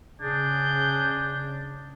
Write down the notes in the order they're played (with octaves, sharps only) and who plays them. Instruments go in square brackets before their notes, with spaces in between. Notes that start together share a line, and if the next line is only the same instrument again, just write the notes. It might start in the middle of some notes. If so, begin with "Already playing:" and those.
[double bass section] C#3 [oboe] D4 [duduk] G#4 [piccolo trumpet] G6